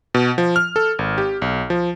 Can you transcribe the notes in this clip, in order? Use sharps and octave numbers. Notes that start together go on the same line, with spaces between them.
B2
F3
F6
A4
G#1
G4
B1
F3